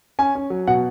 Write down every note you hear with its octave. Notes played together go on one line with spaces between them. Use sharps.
C#4 G#5
C#4
F#3
B2 F#5